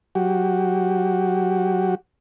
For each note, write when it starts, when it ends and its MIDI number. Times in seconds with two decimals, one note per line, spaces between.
0.15 1.95 54
0.15 1.95 66
0.15 1.95 67